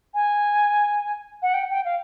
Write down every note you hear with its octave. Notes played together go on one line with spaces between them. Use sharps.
G#5
F#5
G5
G5
F5